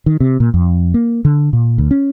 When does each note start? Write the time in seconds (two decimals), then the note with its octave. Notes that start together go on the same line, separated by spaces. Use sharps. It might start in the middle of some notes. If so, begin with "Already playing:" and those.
0.06 D#3
0.20 C3
0.40 A#2
0.54 F2
0.94 A#3
1.25 D3
1.53 A#2
1.78 D2
1.91 C#4